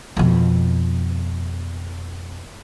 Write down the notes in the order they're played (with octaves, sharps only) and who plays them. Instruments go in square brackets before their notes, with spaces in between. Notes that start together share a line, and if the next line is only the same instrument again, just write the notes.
[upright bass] F2 B2